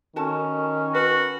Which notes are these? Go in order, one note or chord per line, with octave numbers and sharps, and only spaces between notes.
D#3 C#4 F#4 A4 A5
F#4 B4